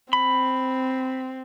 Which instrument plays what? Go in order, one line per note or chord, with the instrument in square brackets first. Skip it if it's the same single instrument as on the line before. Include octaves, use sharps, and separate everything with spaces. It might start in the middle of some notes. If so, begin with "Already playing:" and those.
[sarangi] C4 [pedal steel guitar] B5